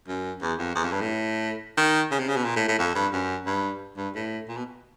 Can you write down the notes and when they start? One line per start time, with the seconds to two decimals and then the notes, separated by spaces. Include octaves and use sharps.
0.08 F#2
0.42 E2
0.59 F2
0.75 E2
0.84 F2
0.92 G2
1.01 A2
1.77 D#3
2.11 C#3
2.19 C3
2.28 C#3
2.36 B2
2.44 A#2
2.56 A2
2.68 A2
2.79 F2
2.95 G2
3.13 F#2
3.46 G2
3.97 G2
4.15 A2
4.48 A#2
4.57 B2